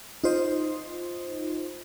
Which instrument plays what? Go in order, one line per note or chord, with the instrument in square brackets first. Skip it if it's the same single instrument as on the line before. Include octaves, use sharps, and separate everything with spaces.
[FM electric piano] D#4 F4 C5 D#5